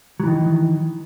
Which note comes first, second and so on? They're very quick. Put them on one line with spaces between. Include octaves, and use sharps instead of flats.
F#3 E3 D#3